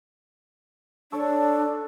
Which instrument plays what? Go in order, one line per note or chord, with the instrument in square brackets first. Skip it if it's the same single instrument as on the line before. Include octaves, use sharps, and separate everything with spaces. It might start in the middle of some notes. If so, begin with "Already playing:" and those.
[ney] D4 [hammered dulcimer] A4 C#5